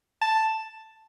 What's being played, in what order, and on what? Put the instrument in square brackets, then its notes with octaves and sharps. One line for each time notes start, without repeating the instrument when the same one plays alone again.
[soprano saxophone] A5